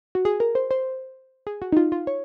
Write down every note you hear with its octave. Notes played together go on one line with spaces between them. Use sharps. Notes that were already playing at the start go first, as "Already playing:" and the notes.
F#4
G#4
A#4
C5
C5
G#4
F#4
D#4
F4
F4
C#5